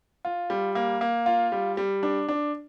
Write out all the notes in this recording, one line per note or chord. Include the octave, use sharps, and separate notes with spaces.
F4
G3
A#3
A#3
F4
G3
G3
D4
D4